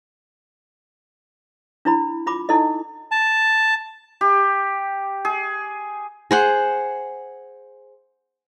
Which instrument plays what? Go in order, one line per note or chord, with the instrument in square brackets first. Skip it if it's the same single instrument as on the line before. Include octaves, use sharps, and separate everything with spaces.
[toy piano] D4 E4 B5
F4 B5 D6
D#4 E4 A4 D#5
[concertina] A5
[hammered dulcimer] G4
G#4
[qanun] G#4 C5 F#5